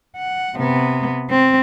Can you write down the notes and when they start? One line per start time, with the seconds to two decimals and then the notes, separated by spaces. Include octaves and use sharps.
0.17 F#5
0.56 C3 B3
1.30 C4